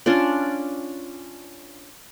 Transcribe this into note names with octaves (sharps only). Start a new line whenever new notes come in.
C#4 D4 F4 D5